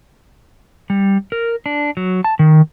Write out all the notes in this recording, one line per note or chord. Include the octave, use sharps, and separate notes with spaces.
G3
A#4
D4
F#3
A5
D#3